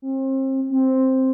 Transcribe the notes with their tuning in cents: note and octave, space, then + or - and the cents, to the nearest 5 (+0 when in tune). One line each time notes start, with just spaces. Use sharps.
C4 +35
C4 +5